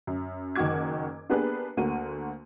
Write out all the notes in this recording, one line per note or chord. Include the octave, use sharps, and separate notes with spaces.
F#2
F#1 D#3 D#4 F#4 D6 G#6
A#3 B3 D4 G4 G#4 B4
D2 D3 A#3 F#4 D#7